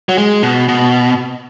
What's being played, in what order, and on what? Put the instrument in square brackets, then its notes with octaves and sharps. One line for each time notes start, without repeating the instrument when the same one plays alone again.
[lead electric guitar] F#3
G#3
B2
B2